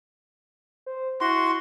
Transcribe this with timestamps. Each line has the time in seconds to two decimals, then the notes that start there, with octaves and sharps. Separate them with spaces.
0.86 C5
1.21 E4 F#4 C6